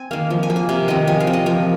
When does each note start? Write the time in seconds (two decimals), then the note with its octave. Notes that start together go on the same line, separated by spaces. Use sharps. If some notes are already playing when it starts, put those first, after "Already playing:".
Already playing: C4 G#5
0.11 D#3 A#3 F5
0.30 F3
0.43 G#5
0.50 A#3
0.56 G#5
0.69 C3 F5
0.88 D#3 C4 D#5
1.07 F3 G#5
1.20 F5
1.27 C4
1.33 D#5
1.46 F3 A#4